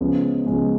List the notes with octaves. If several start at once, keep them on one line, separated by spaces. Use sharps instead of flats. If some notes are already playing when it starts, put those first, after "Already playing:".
C#2 C#3 F3 G#3 B3
C#2 C#3 F3 G#3 B3